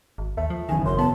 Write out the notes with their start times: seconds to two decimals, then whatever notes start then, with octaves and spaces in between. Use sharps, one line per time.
0.18 G#1
0.37 D#2 A3
0.50 F3
0.69 F#1 E2 D#3 G#5
0.85 G#1 F#2 C6
0.99 B3 A5